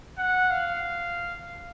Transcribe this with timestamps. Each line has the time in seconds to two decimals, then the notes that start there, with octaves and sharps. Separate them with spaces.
0.18 F#5
0.50 F5